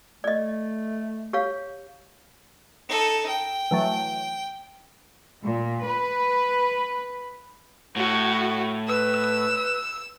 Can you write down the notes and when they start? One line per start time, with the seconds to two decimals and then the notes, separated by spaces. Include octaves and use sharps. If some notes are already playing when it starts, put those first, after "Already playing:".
0.24 A3 D5 D#5
1.33 G4 C#5 F5
2.89 D#4 A4
3.28 G5
3.71 E3 F#3 A3
5.45 A#2
5.84 B4
7.96 A2 F#4
8.88 B4 E6